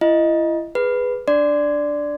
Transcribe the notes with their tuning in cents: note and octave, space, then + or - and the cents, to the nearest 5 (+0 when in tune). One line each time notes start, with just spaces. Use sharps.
E4 +35 D#5 +0
G#4 +0 B4 +0
D4 +0 D5 +0 C6 -15